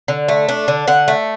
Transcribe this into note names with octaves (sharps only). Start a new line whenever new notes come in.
D3
A3
D4
D3
D3 F#5
A3